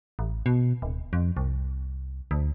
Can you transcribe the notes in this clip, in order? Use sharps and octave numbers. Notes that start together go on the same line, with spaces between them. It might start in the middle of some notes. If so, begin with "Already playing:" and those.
A1
B2
D1
F2
C2
D2